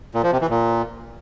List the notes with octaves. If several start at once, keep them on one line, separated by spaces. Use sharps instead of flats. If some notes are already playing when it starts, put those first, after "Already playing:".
A#2
F3
C3
E3
A#2